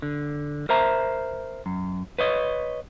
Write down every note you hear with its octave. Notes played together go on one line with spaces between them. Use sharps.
D3
A#4 C5 E5 A#5
F#2
B4 C#5 D#5